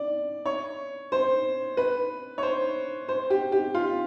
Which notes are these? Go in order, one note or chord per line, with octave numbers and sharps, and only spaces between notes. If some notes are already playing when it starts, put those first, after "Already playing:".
Already playing: D5
C#5
C5
B4
C#5
C5
C5
G4
G4
F4